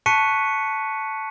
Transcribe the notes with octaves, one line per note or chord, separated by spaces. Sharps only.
A5 C#6 F#6 B6 C#7 D#7